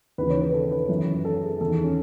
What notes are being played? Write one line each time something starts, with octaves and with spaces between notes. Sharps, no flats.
D#2 C#3 E3 B4
C#5
B4
A4
B4
F#2 E3
A4
G#4
E2 D#3 A4
C#4